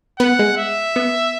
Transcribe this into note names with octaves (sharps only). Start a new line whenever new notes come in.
B3 F#5
G#3
E5
B3